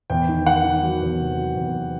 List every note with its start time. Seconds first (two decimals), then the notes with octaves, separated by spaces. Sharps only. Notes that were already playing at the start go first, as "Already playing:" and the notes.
0.10 E2 G5
0.29 D#3
0.46 D#3 F#5
0.64 D#3
0.83 F#3
1.02 E2
1.20 C3
1.38 F#3
1.57 E2